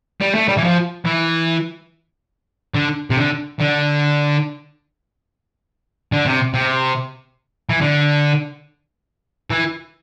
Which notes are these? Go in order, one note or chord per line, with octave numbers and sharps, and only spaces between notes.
G3
A3
G3
E3
F3
E3
D3
C3
D3
D3
D3
C3
C3
E3
D3
E3